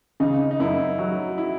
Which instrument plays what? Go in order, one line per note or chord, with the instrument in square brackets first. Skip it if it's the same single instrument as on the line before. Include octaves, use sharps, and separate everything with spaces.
[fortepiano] C#3 [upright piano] D#4
[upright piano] D#4
[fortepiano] F#2 [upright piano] E4
[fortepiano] F#3 [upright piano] F#4
[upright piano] E4